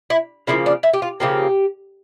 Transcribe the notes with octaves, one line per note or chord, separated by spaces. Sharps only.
E4
C#3 F3 A#3 E4
D4
E4
G4
F4
C#3 F3 A#3 G4